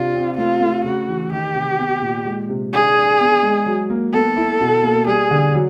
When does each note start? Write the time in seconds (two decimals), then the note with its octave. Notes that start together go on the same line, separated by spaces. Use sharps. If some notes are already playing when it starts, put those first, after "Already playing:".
Already playing: C3 D4 F4
0.15 C4
0.37 A3 F4
0.61 A3
0.84 C#3 F#4
1.08 E3
1.32 D#3 G4
1.55 C3
1.79 B3
2.02 A#2
2.25 G#3
2.49 C3
2.73 D4 G#4
2.96 D4
3.20 B3
3.43 G#3
3.66 F#3
3.90 A#3
4.13 B3 A4
4.37 E4
4.61 B2
4.83 A#3
5.07 G3 G#4
5.31 D3
5.54 F#3